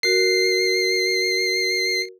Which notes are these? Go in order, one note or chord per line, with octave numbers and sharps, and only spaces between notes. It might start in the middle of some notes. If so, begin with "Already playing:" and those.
F#4 A#4 C7